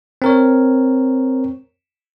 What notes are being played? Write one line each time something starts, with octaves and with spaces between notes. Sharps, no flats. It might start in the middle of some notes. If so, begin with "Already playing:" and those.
C4 A#4 C#5